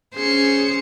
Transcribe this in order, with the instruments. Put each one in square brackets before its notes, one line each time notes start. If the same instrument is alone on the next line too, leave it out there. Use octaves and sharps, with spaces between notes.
[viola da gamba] C#4 C5 [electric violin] G#4 C#7